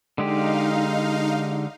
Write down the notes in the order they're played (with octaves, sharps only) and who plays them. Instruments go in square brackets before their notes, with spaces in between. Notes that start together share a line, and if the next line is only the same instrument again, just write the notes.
[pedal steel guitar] D3 G#3 G4 [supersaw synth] D#4 F5